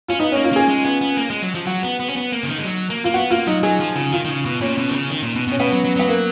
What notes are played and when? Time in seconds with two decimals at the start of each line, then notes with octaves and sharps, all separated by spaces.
0.08 C#4 F4
0.19 B3 D#4
0.32 C#4
0.35 A#3
0.44 F4
0.52 A#3 G#4
0.68 G#3
0.85 B3
1.01 B3
1.17 A#3
1.30 G#3
1.42 F#3
1.55 F3
1.66 F#3 F#4
1.83 B3
2.00 B3
2.09 C#4
2.16 B3
2.32 A#3
2.43 C#3
2.49 D#3
2.58 G#3
2.65 F#3
2.90 A#3
3.04 A#3 F4
3.14 B3 F#4
3.30 A#3 F4
3.47 F#3 D#4
3.63 F#3 G#4
3.80 F3
3.96 C#3
4.12 D#3 F4
4.25 D#3
4.29 C#3
4.46 B2
4.61 A#2 C#4
4.78 B2
4.90 D#3
4.94 C#3
5.10 D#3
5.23 A#2
5.35 B2
5.48 B2
5.52 C#4
5.59 B2 B3
5.72 F#3
5.85 F#3
5.96 F#3 B3
6.09 A#3